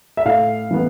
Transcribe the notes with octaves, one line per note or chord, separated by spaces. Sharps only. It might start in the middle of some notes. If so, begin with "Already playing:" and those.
E5
A2 F5
E3 B3